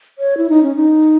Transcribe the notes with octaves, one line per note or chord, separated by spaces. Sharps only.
C#5
E4
D#4
C#4
D#4